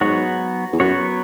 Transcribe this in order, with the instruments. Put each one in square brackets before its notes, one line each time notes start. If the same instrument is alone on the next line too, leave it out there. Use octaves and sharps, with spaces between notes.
[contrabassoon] G#2 [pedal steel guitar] F#3 B3 F#4 C#5
[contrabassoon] E2
[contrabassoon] F#2 [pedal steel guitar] F#3 B3 F#4 C#5